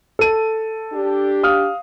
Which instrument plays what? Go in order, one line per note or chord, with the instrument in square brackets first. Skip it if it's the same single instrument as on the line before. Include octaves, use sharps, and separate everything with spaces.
[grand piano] A4 D#7
[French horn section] D4 G4
[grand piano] F5 D#6 F6